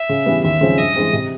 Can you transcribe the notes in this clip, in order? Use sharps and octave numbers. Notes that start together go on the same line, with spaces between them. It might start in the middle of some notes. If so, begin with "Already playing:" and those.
Already playing: E5
C#3
E3 G3 B3
D#2 E5
C#3 F3 G#3 C4
G2 D#5
E3 G#3 C4
C3